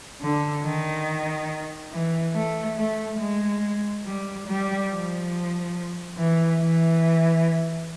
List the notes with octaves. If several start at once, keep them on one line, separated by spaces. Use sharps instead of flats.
D3
D#3
E3
A3
A3
G#3
G3
G3
F3
E3
E3